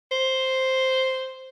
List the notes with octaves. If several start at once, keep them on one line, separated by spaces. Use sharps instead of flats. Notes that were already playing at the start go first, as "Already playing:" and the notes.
C5